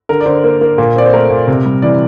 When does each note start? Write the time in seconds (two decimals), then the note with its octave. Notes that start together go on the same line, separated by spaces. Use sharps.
0.09 D3 A#4
0.21 D5
0.26 D3 C5
0.44 A#3
0.61 A#3
0.78 A#2
0.96 C4 D5
1.06 C5
1.13 A3 A#4
1.30 A#2
1.48 C3
1.66 G3
1.82 E3 D5